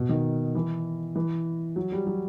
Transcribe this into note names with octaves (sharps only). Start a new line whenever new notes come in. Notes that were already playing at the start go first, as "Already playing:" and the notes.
Already playing: B2
D#3
E3
E3
F#3
G3
F#3